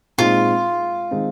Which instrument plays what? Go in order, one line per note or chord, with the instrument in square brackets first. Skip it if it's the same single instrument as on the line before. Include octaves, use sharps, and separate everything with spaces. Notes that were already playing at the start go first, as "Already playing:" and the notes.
[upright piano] A#2 G#3 C4 D#4 [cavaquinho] F4
[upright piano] D#3 G#3 C4 D#4